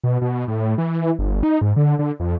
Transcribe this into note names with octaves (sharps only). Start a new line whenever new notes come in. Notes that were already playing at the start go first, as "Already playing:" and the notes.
B2
B2
A2
E3
G1
D#4
G#2
D3
D3
F2